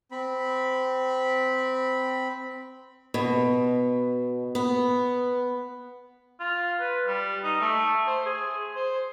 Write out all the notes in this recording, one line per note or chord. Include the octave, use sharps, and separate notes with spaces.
C4 B5
B2
B3
F4
B4
G3
D#4
A3
C5
G#4
C5